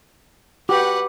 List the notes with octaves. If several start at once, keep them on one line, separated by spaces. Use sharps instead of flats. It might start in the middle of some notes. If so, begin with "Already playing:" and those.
F#4 G4 B4 F#5 D6